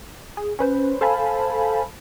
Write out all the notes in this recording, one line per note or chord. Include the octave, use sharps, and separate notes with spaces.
G#4
C#4 B4 C5
A4 C5 F5 G#5 A5 B5